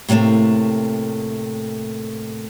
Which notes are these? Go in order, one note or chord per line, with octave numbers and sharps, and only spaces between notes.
A2 C3 F#3 A3 A#3